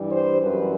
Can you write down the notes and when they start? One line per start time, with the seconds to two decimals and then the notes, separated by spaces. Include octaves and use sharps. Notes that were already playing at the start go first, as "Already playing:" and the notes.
Already playing: G2 E3 G3
0.11 C5
0.41 F#2 E3 G3 B4